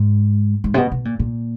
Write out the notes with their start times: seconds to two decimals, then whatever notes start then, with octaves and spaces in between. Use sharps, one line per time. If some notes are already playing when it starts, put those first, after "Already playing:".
Already playing: G#2
0.64 G#2
0.74 C3
0.77 B2
0.92 B2
1.05 A#2
1.19 A#2